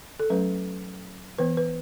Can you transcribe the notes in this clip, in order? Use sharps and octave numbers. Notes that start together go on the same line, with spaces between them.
A4
F#3 A3 C#4 B4
E3 B3 B4
B4